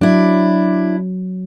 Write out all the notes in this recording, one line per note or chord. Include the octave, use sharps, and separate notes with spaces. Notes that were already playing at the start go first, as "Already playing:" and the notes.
F#3 D4 E4